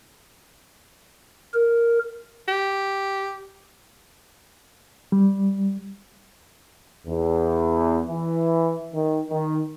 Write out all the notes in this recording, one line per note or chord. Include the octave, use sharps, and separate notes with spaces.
A#4
G4
G3
E2
E3
D#3
D#3